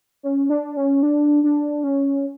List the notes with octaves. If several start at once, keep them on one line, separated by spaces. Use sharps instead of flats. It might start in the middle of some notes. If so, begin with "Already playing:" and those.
C#4
D4
C#4
D4
D4
C#4